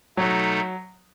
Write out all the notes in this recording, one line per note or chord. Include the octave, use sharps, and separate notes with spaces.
B2 F#3 A3 D#4 A4